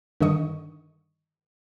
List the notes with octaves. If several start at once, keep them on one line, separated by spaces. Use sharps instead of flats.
G2 D3 D#3 D#5 C#6